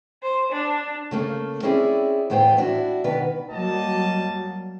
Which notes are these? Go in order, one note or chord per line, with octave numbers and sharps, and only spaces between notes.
C5
D4
C#3 A3 A#3
C4 C#4 E4 G#4 D5
E2 A2 B3 C5 G5
D4 E4 F#4
B2 D#3 B3 B4
F#3 G3 A#3 D#5 A5